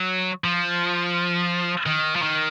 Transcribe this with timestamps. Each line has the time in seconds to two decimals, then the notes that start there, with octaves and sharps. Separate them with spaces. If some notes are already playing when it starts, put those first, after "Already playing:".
Already playing: F#3
0.44 F3
1.86 D#3
2.16 F3
2.22 D#3